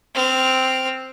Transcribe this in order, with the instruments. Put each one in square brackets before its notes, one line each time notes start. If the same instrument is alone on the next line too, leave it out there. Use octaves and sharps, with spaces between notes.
[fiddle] C4 F6